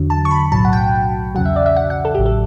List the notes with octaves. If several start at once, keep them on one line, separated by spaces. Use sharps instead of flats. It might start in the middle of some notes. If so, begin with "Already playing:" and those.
Already playing: E2 D3 F#3
A5
C#6
B5
B1 A2 F#3 A5
F#5
G5
E2 C#3 F#3 F#5
E5
D5
E5
F#5
F#5
A4
A1 A2 F#3 G4
A4